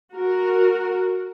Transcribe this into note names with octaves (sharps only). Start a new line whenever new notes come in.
F#4 A#4